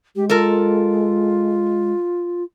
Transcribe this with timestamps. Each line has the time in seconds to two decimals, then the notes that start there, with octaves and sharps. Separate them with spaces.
0.15 G#3 G4
0.30 F4 A4 A#4